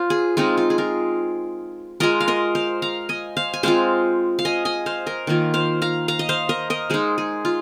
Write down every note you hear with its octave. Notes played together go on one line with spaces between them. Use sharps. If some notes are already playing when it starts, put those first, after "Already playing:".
Already playing: F4 C5
G#4
G#3 C4 D#4 F4
F4
G#4
F4 A#4
G#3 F4 A#4 D#5
F5
A#4 D#5
C5 F5
F5 A#5
D#5 G#5
C5 F5
G#5
G#3 C4 F4 C5 F5
F5
D#5 G#5
D#5 G#5
C5 F5
A#4 D#5
D#3 A#3 F4
C5 F5
F5 A#5
F5 A#5
D#5
C5 F5
A#4 D#5
A#4 D#5
G#3 D#4 G#4 C5
G#4
F4